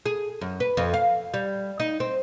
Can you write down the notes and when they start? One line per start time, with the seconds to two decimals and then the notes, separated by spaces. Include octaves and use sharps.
0.06 G#4
0.41 F#2
0.60 B4
0.77 F2
0.94 F5
1.34 G3
1.80 D#4
2.00 C4